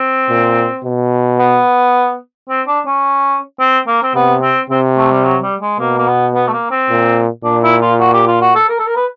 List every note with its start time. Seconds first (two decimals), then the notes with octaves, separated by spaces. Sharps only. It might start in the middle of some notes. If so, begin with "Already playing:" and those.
Already playing: C4
0.29 A#2
0.84 B2
1.39 B3
2.49 C4
2.67 D4
2.86 C#4
3.60 C4
3.87 A#3
4.03 C4
4.15 C3 B3
4.42 C4
4.70 C3 C4
4.97 A3
5.12 G3
5.24 F#3
5.43 G3
5.61 G#3
5.79 B2 A#3
5.98 A#3
6.08 B3
6.35 B3
6.48 A3
6.53 A#3
6.71 C4
6.90 A#2
7.44 A#2 D4
7.63 E4
7.82 F4
8.00 F#4
8.14 G4
8.27 F4
8.41 F#4
8.55 A4
8.69 A#4
8.79 A4
8.87 A#4
8.96 B4